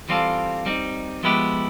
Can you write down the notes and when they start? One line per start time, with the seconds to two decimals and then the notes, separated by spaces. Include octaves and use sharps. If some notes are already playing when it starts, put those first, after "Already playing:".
0.09 E3 G3 C4 F4 A4
0.66 G3 C4 D#4
1.23 F3 G#3 B3 E4 G4